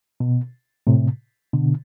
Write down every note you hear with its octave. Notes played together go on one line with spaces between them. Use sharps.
B2
A2 C3
B2 D3